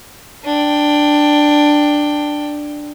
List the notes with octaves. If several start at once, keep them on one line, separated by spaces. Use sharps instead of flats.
D4 G5